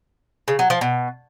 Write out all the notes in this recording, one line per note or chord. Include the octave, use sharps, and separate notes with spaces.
C#3
F#3
F3
B2